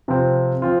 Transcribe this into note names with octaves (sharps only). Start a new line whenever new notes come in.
C3 F3 C4 F4
F3 C4 F4